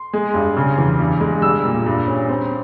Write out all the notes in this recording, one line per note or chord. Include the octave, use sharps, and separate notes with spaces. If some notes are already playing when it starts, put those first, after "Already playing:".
Already playing: C6
G#3
G2
C#3
E2
G2
G#3
G3 E6
A#2
G2
C#4
C4